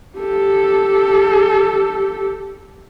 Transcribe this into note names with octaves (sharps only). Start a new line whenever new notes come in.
G4 A4